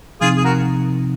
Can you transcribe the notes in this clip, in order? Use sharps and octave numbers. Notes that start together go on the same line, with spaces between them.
C3 F3 C4 D#4 F4 G#4
G#4
F#4 A#4